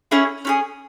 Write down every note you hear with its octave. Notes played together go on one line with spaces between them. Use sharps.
C#4 E4 G#4
C#4 E4 G#4